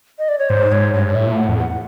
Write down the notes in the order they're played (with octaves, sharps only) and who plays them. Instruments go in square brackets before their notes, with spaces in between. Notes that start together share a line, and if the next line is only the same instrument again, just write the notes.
[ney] D#5
D5
C#5
[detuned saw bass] G#2 [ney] C5
[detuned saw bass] G#2 [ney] C#5
[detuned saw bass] G2 [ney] C#5
[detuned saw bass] A2 [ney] E5
[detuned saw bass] A#2
[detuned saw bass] A2 [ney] F#5
[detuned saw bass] F2
[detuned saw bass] E2 [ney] F#5